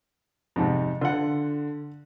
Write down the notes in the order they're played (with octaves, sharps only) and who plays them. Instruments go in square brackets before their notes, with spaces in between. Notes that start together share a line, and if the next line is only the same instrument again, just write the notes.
[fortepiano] F2 G#2 C3
[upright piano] D3 [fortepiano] F4 F#5